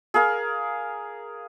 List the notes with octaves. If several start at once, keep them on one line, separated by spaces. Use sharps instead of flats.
G#4 A#4 F5